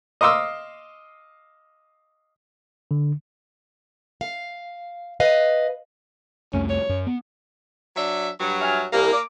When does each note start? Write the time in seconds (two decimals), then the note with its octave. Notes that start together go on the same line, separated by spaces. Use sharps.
0.21 D#5 F5 C6 D6 E6
2.91 D3
4.21 F5
5.20 B4 D#5 F5
6.53 C2 F2 A3 C#4
6.70 C#5
6.89 F#2
7.07 B3
7.96 F#3 D4 E5
8.40 G2 F#3
8.61 E5 G#5 F6
8.93 C2 A#3
9.12 D6